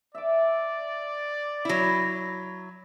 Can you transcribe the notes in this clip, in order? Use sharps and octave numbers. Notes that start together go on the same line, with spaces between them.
D5 E5 D6
F#3 E4